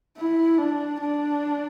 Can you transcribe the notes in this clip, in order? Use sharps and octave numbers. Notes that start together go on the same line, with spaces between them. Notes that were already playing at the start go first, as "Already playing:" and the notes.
E4
D4
D4